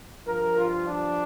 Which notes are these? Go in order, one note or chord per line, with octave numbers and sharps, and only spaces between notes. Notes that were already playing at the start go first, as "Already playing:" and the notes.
G2 F3 A#4
F4
D4